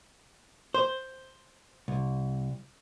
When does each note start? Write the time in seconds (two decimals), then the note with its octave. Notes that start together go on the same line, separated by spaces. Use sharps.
0.74 C5
1.88 C2